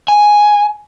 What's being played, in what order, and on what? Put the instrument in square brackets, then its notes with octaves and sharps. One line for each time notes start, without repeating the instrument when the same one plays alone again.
[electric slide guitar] G#5